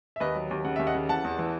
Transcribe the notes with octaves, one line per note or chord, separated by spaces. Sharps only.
E5
D#2 B4 D#5
F#3
D#2
C#3 F#5
D#2 E5
D#5 F#5
C#3
E3 F#5 A5
E2
E3